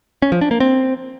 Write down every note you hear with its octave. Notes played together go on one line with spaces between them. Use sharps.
C#4
F3
D4
A#3
C4